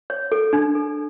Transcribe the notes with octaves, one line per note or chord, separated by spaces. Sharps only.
C#5
A4
D4
A4